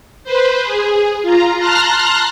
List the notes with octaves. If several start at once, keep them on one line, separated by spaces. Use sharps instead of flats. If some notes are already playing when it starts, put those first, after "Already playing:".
B4 C5
G#4
F4 A#5
A5 A#5 C6 F6 F#6 A#6